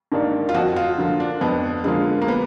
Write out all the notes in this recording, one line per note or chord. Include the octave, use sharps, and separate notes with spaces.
G#2 D#3 A#3 D4
F4
F2 F#4
F4
D3 F3 A#3 F4
D4
F2 B3
D3 F3 G#3 A#3 F4
A#3
B3